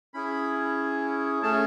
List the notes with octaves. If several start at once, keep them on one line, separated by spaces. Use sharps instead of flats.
C#4 E4 G#4 B5
A3 C#4 G#4 A5